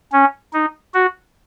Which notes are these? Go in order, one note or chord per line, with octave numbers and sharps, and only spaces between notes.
C#4
D#4
F#4